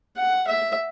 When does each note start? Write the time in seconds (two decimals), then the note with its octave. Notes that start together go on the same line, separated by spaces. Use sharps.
0.17 F#5
0.47 E5